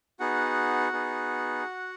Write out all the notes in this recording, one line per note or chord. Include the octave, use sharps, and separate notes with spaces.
B3 D#4 F#4 G#4 F#5
B3 D#4 G#4